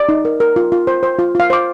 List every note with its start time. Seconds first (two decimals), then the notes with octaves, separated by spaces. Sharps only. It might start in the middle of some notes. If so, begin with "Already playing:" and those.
Already playing: D5
0.09 D#4
0.25 A#4
0.40 A#4
0.56 F4
0.72 F4
0.87 C5
1.03 C5
1.19 F4
1.35 F4 F5
1.50 C5 D6